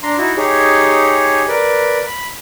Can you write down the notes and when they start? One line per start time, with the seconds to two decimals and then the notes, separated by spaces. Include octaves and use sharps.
0.03 D4 A#5 C6
0.18 D#4 E4 F#4
0.37 D#4 G4 G#4 C#5
1.48 A#4 B4 D5
2.07 B5